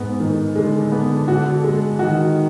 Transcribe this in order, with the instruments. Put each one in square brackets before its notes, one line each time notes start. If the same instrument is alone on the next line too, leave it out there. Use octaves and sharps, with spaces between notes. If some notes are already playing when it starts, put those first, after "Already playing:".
Already playing: [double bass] G#2 [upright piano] B3
[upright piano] D#3
[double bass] D3 [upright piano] G#3
[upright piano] B3
F#4
G#3
[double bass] D#3 [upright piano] F#4